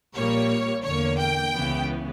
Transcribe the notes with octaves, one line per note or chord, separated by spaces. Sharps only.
A#1 A#2 G3 A#3 C#5
E2 D3 A#3 C#5
G5
C#2 C#3 E3 B3